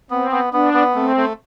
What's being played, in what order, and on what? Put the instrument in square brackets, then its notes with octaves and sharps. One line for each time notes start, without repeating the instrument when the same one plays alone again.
[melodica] B3 [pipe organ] C4
[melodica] B3
[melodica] B3 [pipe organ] D4
[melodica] B3
[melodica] A3 [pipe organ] C4
[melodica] A3